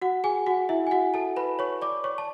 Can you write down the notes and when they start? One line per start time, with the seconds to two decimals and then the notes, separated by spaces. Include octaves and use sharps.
0.02 F#4 F#5
0.24 G#4 G#5
0.46 F#4 F#5
0.69 E4 E5
0.87 G#5
0.91 F#4 F#5
1.14 A4 A5
1.36 B4 B5
1.59 C#5 C#6
1.82 D5 D6
2.04 C#5 C#6
2.18 A5